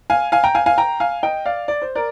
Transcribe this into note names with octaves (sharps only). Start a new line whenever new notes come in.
F5 G#5
F5 G#5
G5 A#5
F5 G#5
F5 G#5
G5 A#5
F5 G#5
D#5 G5
D5 F5
D5
C5
A#4 D5